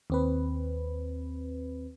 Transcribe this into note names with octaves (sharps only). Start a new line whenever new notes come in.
D#2 C4 B4